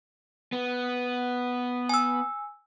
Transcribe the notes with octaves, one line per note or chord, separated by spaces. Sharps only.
B3
G#5 E6